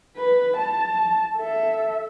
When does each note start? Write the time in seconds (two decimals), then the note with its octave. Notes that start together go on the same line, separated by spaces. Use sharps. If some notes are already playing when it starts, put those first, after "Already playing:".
0.17 B4
0.58 A5
1.37 A4 E5